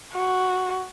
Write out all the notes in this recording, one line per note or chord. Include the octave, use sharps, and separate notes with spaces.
F#4